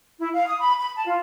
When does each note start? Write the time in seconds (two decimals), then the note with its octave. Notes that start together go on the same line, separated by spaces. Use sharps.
0.19 E4
0.33 F5
0.47 D#6
0.60 B5
0.78 B5
0.95 A5
1.06 F4